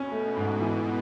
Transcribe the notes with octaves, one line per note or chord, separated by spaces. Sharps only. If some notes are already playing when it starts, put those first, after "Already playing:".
Already playing: B2 C#4
A3
G#2
B2 E3